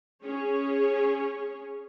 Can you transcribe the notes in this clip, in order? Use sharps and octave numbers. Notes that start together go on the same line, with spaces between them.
C#4 G#4 C#5